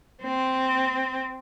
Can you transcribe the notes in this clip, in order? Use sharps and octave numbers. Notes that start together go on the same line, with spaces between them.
C4